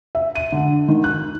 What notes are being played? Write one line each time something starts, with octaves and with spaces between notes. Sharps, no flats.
E5
D#7
D3
D#3
F#6